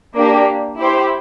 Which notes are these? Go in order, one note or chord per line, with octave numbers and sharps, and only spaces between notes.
A#3 D4 G4
E4 G4 C5